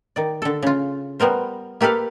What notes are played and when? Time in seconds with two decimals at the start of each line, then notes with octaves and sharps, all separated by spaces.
0.16 D#3 D5
0.42 D3 A4
0.62 C#3 F4
1.20 G3 B3 A#4 C5
1.81 A#3 G4 A4 B4 F5